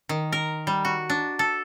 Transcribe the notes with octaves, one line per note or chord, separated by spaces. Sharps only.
D#3
A#4
G3
F#4
D4
A4